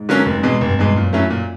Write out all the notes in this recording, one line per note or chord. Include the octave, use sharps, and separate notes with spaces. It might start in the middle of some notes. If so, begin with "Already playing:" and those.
Already playing: G#2
D3 F#3 A#3 C#4
F1
E2 B2 G#3
F1 G2
E2 B2 G#3
F#2 A#2
F#3 A3 C#4 E4
A#2